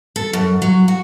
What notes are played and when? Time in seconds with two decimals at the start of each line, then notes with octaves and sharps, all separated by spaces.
0.16 A4
0.33 F#2
0.62 F#3
0.88 F#4